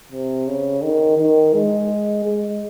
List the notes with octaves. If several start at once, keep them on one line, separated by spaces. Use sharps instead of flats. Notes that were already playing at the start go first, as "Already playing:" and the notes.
C3
C#3
D#3
D#3
G#3
G#3